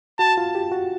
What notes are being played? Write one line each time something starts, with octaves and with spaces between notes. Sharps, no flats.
F#4 A5
F4
G4
F#4